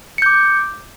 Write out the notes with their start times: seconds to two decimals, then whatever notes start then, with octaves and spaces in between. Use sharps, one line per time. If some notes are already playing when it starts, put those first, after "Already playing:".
0.18 C#7
0.22 G6
0.26 D6